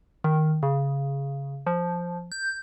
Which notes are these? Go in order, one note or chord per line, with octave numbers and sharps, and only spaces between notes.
D#3
C#3
F3
G6